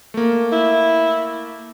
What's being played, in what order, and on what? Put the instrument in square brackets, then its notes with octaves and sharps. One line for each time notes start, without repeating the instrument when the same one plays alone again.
[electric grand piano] A3 A#3
[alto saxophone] E4